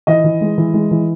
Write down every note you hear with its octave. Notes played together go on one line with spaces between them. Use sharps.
E3 D#5
E3
G#3
E3
G#3
E3